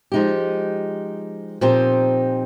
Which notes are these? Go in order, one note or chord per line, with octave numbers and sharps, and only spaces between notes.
F3 G#3 D#4 G4
A#2 F3 C4 D#4 G4